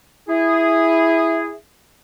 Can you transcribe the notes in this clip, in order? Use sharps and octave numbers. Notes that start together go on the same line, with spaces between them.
E4 G#4